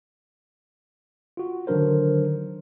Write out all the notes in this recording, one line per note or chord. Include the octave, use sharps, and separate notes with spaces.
F4 F#4
D3 D#3 F#3 D4 A#4 C5